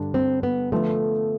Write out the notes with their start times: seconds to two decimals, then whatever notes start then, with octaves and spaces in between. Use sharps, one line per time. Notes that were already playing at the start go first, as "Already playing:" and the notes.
Already playing: G2 D3 G3 D4
0.14 C4
0.43 B3
0.72 D3 F3 A3 B3